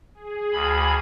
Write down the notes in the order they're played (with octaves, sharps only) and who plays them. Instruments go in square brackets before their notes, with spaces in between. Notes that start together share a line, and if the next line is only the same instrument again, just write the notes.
[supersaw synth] G#4
[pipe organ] D2 B5